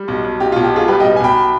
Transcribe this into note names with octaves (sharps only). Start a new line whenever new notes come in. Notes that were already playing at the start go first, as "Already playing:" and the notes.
Already playing: G3
B1
B1
B1 G4
F4
B1
G4
B2 F4 G#4
G3 G4 B4
D#5 G5
B1
G#5
B1 G5 B5